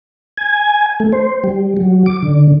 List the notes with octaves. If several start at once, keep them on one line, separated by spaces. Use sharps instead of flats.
G#5
A3
C5
G3
F#3
D6
D3